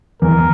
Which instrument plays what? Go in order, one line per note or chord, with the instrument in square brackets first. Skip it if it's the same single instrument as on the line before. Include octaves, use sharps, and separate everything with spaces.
[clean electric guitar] E2 [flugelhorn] A#4